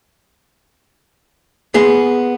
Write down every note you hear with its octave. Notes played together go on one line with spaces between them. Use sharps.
B3 G#4 C6